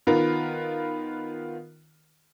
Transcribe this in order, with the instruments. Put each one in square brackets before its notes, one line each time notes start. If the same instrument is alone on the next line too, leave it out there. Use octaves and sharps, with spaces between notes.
[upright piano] D#3 B3 F4 A#4